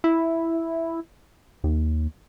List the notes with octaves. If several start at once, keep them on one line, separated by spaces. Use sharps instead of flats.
E4
D#2